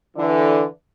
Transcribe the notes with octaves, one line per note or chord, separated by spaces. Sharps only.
D3 E3